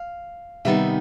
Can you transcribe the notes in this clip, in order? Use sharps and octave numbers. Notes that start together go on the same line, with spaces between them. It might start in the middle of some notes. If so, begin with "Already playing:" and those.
Already playing: F5
C3 D#3 G3 B3 D#4 E5